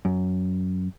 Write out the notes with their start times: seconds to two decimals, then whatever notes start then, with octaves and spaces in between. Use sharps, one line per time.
0.05 F#2